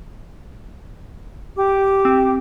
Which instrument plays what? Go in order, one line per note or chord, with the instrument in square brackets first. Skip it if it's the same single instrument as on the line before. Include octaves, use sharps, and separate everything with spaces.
[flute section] G4 D6
[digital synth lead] C4